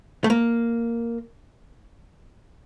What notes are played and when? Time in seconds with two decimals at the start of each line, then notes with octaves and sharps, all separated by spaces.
0.24 A3
0.30 A#3